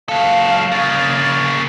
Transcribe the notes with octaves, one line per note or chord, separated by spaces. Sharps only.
F#3 A4 F5
C#3 A#3 A6